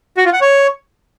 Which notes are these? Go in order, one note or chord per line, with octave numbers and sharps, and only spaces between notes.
F#4
F4
F#5
C#5